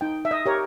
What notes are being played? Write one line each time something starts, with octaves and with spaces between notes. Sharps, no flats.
D#4 G5
E5
D#5
G4 A#4 C#5